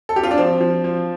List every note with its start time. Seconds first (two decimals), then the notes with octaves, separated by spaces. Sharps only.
0.09 A4
0.16 G4
0.23 F4
0.31 D4
0.37 F3 C4
0.61 F3
0.84 F3